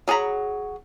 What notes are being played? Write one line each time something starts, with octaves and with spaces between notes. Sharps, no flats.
F#3 G#4 F#5 A#5 B5